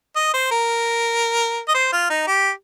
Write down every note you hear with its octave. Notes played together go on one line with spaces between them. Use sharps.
D#5
C5
A#4
D#5
C5
F4
D#4
G4